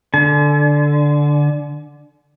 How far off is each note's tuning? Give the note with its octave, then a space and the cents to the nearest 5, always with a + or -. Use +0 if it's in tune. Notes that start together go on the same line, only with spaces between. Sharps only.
D3 +0 G#5 +45